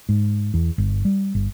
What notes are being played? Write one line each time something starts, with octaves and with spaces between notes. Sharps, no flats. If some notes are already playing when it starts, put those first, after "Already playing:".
G#2
E2
G1
G3
G1